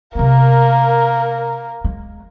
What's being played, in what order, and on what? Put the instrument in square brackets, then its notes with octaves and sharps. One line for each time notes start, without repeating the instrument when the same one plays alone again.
[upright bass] C3 B3 [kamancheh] A#3 A#4
[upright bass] G#3